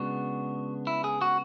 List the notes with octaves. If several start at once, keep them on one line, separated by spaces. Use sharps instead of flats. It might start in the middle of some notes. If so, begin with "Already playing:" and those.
Already playing: C#3 G#3 B3 D4 F#4
E4
G#4
F#4